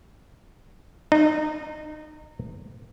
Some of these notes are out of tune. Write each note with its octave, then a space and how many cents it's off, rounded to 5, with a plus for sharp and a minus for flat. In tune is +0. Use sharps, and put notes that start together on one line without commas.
D#4 -25